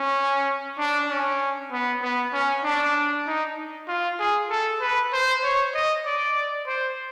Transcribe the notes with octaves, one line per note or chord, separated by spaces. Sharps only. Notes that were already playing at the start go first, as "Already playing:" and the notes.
Already playing: C#4
D4
C#4
B3
B3
C#4
D4
D#4
F4
G#4
A4
B4
C5
C#5
D#5
D5
C5